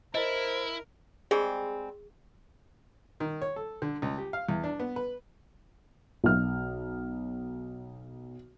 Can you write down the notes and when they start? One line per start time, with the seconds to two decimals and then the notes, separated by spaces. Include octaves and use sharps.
0.15 E4 A#4 C5 D#5
1.31 G3 G#3 C4 G#4
3.20 D#3
3.42 C#5
3.56 A4
3.82 D3
4.02 C#2
4.18 G4
4.33 F5
4.49 E2
4.64 D4
4.79 B3
4.96 B4
6.24 B1 F6